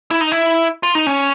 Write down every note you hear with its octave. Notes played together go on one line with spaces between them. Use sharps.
E4
D#4
E4
F4
D#4
C#4